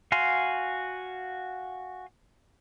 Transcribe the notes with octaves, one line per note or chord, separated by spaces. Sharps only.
F#4 F5 G#5 C6